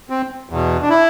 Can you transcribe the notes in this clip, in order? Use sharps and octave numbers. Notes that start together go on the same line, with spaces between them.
C4
E2 B2
D4
E4